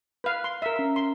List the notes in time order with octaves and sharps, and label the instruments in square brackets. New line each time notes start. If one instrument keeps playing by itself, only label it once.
[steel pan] B4 F5
C6
A#4 E5
[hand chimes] C#4 A#5
[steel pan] C6